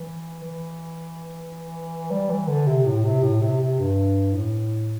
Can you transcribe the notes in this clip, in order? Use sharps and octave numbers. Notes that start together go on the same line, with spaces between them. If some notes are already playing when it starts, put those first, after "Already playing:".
Already playing: E3
E3
G3
E3
D3
C3
A2
C3
A2
C3
C3
G2
A2